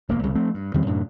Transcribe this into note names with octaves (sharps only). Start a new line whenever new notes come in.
E1 D2 A#3
C2 C#3 G3
F3 A3 C4
G2
E2 D#3 G3 C4
F#2 A2 C3 D4